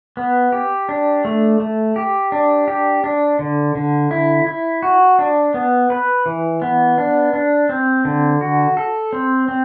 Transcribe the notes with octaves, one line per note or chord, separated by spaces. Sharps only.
B3
G4
D4
A3
A3
G4
D4
G4
D4
D3
D3
E4
E4
F#4
D4
B3
B4
E3
B3
D4
D4
C4
D3
F#4
A4
C4
C4